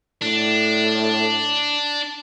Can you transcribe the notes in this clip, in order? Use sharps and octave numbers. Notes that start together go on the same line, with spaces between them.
A2 D4